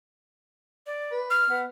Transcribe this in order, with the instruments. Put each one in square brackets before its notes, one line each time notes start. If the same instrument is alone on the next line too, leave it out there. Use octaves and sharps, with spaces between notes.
[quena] D5
[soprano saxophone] B4
[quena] F6
[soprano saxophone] B3